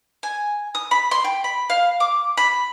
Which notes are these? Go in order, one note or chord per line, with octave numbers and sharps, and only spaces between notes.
G#5
D#6
B5
C6
G5
B5
F5
D6
B5